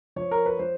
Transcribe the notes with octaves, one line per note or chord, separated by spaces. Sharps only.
F3 C#5
A#4
B4
F3 C5